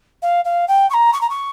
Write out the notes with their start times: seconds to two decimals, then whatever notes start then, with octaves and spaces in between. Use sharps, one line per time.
0.22 F5
0.45 F5
0.68 G5
0.90 C#6
0.94 A#5
1.13 C#6
1.21 A#5
1.30 C#6